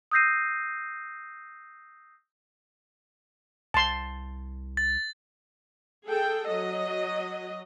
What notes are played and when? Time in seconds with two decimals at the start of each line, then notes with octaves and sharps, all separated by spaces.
0.11 D#6 E6 G6 A#6 C7 D#7
3.74 C2 A5 C6
4.77 A6
6.07 G#4 A4 G5
6.48 F#3 D#5